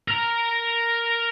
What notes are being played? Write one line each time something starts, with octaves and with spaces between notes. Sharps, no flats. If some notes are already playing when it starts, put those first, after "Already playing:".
A#4 A#5